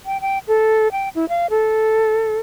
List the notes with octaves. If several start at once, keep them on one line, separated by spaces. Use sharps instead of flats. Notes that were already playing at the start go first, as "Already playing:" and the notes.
G5
G5
A4
G5
E4
F5
A4